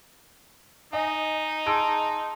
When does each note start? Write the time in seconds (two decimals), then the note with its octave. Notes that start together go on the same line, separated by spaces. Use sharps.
0.93 D#4 D#5 G#5
1.66 G#4 A5 A#5 C6 E6 D7